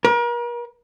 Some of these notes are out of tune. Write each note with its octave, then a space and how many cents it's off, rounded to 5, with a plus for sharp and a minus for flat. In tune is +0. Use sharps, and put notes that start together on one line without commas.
A#4 +40